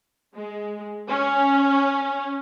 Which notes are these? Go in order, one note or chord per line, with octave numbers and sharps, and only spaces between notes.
G#3
C#4